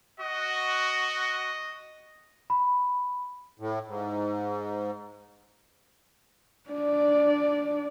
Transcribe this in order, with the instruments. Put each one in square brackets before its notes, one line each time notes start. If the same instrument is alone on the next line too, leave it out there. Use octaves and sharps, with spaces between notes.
[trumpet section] F#4 [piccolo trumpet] D#5
[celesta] B5
[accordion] A2
G#2
[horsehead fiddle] D4 D5